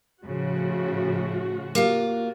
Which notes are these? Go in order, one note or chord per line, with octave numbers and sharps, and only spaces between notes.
A2 C#3 F3 F#4
A#3 F4 G4 F5